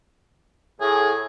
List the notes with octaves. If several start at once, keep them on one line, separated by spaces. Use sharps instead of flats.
A2 G#4